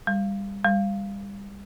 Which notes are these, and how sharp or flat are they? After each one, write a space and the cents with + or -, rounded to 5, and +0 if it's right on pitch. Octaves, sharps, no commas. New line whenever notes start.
G3 +25
G3 +30